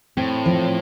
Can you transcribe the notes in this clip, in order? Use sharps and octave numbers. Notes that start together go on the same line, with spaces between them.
A2 C4
F3